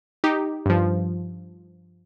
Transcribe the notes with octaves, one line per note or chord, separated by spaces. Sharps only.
D#4 G4
G2 F3